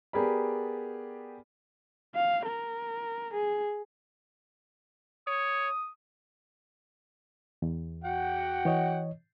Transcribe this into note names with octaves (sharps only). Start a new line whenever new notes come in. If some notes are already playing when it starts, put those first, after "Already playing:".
B3 G4 G#4 A#4 D5 B5
F5
A#4
G#4
C#5 D#6
E2
F#4 F#5 G5
E3 C#5 D#5